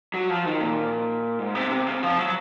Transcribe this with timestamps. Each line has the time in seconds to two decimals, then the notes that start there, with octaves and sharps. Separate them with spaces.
0.14 F#3
0.30 F3
0.45 D#3
0.61 A#2
1.39 G#2
1.55 C3
1.71 C3
1.87 C#3
2.03 F3
2.18 F#3